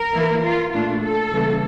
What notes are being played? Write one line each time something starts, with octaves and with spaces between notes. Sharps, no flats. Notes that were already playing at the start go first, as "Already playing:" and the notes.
Already playing: A#4
E3 A#3 E4
F4
A#2 A3 D4 F4
A4
C#3 E3 G3 A#3